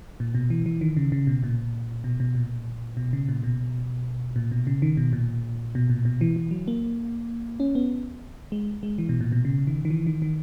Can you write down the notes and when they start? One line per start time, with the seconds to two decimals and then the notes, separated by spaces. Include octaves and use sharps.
0.20 A#2
0.35 B2
0.50 E3
0.66 E3
0.81 D#3
0.97 C#3
1.12 C#3
1.27 B2
1.44 A#2
2.04 B2
2.20 B2
2.35 A#2
2.97 B2
3.13 C#3
3.29 A#2
3.43 B2
4.36 A#2
4.52 B2
4.67 C#3
4.82 D#3
4.97 B2
5.13 A#2
5.75 B2
5.90 A#2
6.05 B2
6.21 E3
6.36 E3
6.51 F#3
6.68 A#3
7.60 C#4
7.75 B3
8.52 G#3
8.83 G#3
8.98 E3
9.09 B2
9.21 A#2
9.32 B2
9.45 C#3
9.67 D#3
9.85 D#3
9.90 E3
10.07 D#3
10.22 D#3